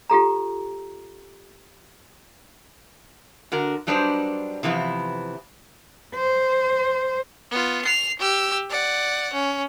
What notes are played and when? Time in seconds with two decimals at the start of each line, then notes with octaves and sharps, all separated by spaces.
0.10 F4 G4 A4 A#5
3.52 D3 F#4 A#4
3.87 F#3 G3 D4 D#4 B4 C5
4.63 C3 E3 F3 B3 E4
6.14 C5
7.50 B3 F4
7.85 C7 F7
8.19 G4 E6
8.70 D5 F#5
9.33 C#4